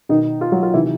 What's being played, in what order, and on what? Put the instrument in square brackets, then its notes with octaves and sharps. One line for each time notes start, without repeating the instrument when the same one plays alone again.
[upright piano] B2 D#3 D#4
F4
F#3 F#4
F4
C3 D#3 E3 E4